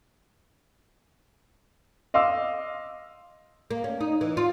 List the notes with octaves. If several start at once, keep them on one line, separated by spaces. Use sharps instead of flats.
D#5 F5 C6 D6 E6
A#3
C#4
D#4
E3
F4